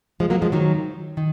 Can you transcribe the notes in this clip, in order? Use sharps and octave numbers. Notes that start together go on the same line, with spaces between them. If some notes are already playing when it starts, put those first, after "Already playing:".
F3 G#3
F#3 A#3
F3 G#3
D#3 F#3
D#3